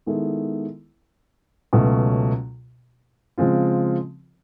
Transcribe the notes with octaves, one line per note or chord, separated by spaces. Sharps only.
D#3 G#3 B3 E4 A4
C#2 B2 F#3 A3 C#4
C#3 F3 G#3 C4 F4